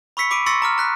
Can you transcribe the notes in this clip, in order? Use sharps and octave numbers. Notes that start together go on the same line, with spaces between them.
B5 C#6 E6 B6 C#7
B5 D6 D7 D#7
C6 C#6 E6 A6 A#6 C#7
A#5 D6 F6
A#5 F#6 B6